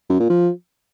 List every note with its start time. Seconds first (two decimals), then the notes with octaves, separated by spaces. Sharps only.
0.10 F#2
0.20 A#2
0.30 F3